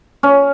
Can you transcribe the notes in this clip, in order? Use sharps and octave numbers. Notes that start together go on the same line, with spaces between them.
C#4